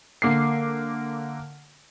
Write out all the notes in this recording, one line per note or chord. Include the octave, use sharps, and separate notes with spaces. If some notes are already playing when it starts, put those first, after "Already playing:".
D3 A#3 D6 C7